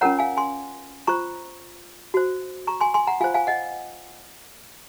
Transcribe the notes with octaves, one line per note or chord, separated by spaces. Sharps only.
C#4 F4 A#4 C#5 F#5 A#5
F5 G#5
G#5 C6
F4 C5 A#5 C#6
F#4 C5
A#5 C#6
G#5 C6
G#5 C6
F#5 A#5
F4 C5 F5 G#5
F5 G#5
D#5 F#5